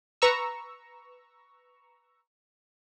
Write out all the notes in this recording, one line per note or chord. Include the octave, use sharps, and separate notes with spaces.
B4 A#5 C#6 E6